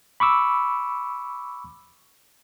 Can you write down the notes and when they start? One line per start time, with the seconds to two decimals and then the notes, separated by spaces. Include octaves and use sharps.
0.20 B5 C#6 D6 E6